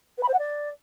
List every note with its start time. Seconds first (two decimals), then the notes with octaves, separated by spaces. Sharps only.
0.17 B4
0.23 B5
0.28 C5
0.33 F#5
0.38 D5